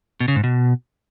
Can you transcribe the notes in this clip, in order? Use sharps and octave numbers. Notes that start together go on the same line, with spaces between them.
B2
C#3
G#2
B2